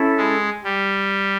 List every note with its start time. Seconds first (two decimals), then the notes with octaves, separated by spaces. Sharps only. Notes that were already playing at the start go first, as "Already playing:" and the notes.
Already playing: C#4 E4 A4
0.17 G#3
0.63 G3